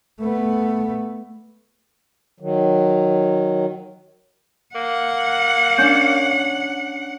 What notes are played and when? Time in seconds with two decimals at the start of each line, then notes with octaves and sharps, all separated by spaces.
0.19 A3 B3
2.40 D#3 F#3
4.75 A#3 F#5
5.78 C#4 D4 G6 C#7